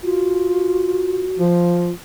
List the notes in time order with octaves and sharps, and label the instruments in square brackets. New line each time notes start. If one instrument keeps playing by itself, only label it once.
[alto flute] F4 [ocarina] F#4
[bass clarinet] F3 [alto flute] F4